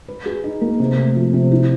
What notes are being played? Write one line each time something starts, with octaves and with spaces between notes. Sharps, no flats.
B4
G#4
D#4
A#3
C3
A3
F3
C3
E4